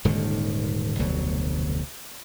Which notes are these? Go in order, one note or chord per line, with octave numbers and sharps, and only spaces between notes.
D#1 G#2 D3 D#3
F1 D2 B2 F#3